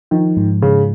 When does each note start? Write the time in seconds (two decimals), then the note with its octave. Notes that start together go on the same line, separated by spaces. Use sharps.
0.11 D#3 F3
0.37 G#2
0.62 G#2 C#3